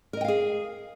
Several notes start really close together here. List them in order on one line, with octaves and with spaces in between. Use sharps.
A#4 D#5 G5 F5 G#4